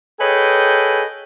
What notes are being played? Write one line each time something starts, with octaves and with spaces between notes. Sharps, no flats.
G#4 A4 B4 C#5 D#5 G5